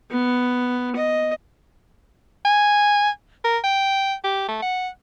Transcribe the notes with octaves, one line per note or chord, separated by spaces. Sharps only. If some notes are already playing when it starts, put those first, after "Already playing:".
B3
D#5
G#5
A#4
G5
G4
A3
F#5